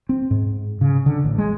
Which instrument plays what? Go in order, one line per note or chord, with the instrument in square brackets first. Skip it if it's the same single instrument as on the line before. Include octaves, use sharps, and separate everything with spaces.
[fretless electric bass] C4
G#2
C#3
D3
A1
G#3